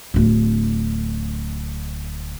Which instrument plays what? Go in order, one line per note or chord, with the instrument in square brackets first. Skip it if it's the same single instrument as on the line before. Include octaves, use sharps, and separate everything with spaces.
[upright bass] D1 D3